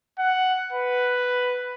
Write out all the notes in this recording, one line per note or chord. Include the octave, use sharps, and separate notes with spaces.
F#5
B4